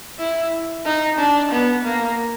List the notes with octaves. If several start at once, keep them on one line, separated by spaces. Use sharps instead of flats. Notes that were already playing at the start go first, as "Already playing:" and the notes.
E4
D#4
D4
B3
A#3